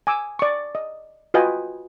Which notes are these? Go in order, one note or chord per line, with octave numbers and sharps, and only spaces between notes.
G#5 D6 E6
D5 C#6
D#5
F4 F#4 B4 D#5 G5 G#5